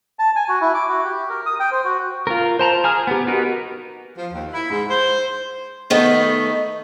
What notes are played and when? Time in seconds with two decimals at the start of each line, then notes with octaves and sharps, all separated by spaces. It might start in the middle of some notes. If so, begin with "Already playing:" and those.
0.19 A5
0.36 G#5
0.49 F#4
0.61 E4
0.74 D6
0.89 F#4
1.04 G4
1.29 A#4
1.46 D#6
1.60 G5
1.72 C5
1.85 F#4
2.27 F4 A#4
2.59 C5 A5 A#5
2.84 G#4 G#5 F6
3.07 B3 G4
3.27 B3 D#4 F#4 A#4 B4
4.16 F3
4.32 D#2
4.51 E4
4.70 G#2
4.89 C5
5.90 D#3 A3 B3 D#4